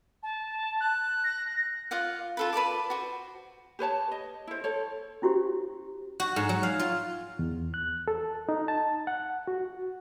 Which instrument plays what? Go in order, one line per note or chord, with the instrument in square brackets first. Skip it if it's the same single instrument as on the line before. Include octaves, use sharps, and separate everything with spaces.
[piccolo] A5
[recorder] F#6
[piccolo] A#6
[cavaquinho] F4 D5 F5 F#5
F4 A4 B4
B4 D5 A5 D6
F#4 C5
[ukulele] G4 B4 C#5 A5
D#5
E4 C5
A4 C5 C#5
[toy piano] C#4 E4 F#4 G4 C5
[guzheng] F#4
G#2
F#3
F5
F4
[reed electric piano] E2
F#6
A4
D#4
A5
F#5
F#4